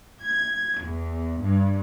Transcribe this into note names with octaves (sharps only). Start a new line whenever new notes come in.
G#6
E2
G2